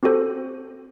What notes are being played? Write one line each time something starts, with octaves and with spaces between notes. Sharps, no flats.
C4 F#4 G4 A4 C5